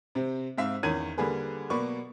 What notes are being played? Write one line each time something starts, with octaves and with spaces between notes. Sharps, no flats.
C3 C4
G#2 C4 E5 F5
E2 D#3 C#4 G#6 D#7
D3 G3 A#3 G#4 B4
B2 F#3 A#3 B4 D5 C#6